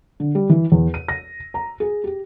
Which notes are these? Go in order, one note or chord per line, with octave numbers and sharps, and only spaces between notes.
D3
G3
E3
E2
D#7
A#6
A#5
G#4
G4